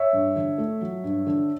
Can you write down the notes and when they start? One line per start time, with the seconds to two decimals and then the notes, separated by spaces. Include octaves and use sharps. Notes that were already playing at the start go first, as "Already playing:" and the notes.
Already playing: C#5 E5
0.13 G2
0.36 D3
0.58 A3
0.81 F#3
1.04 G2
1.26 D3